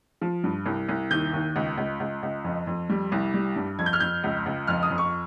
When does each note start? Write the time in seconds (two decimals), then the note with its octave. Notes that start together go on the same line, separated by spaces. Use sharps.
0.21 F3
0.44 G2
0.66 C2
0.89 C2
1.11 D#2 G6
1.33 D#2
1.56 C#2
1.78 C#2
2.00 C#2
2.23 C#2
2.44 F2
2.67 F2
2.89 G3
3.12 C2
3.34 G3
3.56 G2
3.79 F2 G#6
3.86 G6
3.93 F6
4.00 F2 G6
4.24 C#2
4.46 C#2
4.67 F2 F6
4.83 D#6
4.90 F2
4.98 C#6